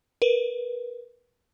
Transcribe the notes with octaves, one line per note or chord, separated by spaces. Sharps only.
A#4 B4